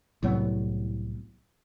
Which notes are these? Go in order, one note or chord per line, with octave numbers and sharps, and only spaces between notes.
C2 A2 F#3 B3